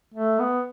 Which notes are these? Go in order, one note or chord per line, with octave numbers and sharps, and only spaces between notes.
A3
B3